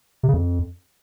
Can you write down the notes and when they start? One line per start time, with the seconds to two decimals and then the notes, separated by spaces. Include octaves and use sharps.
0.23 C3
0.29 C#3
0.34 F2